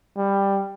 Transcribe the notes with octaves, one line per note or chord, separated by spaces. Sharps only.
G3